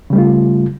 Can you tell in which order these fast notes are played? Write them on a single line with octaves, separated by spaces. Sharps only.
C#3 G3 A3 F4